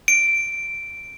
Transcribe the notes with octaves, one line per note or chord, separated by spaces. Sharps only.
D7